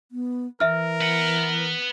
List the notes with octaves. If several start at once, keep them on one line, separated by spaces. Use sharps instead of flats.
B3
E3 A#4 E5 F6
B4 F#5